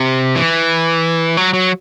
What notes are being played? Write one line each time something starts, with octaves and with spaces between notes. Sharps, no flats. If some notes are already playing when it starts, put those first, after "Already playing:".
Already playing: C3
E3
F#3
F#3